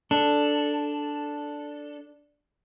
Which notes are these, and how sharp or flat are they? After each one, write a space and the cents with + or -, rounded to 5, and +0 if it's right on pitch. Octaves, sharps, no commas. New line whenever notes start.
D4 +0 A4 +0